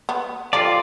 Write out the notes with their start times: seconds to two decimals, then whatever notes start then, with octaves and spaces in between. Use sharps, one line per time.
0.09 B3
0.53 F3 F4 G4 A4 D5